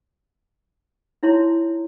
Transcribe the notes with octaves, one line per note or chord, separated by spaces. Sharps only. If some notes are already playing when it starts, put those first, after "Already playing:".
D#4 E4 C#5 A#5 C6